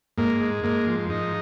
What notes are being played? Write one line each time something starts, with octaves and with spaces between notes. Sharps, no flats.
G#2 A#3
G#3
G#2 A#3
F3
G#2 D#4